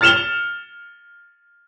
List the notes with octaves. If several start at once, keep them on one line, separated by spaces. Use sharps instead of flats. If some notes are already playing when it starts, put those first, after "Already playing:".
F6 A6 C#7 E7 F7 G7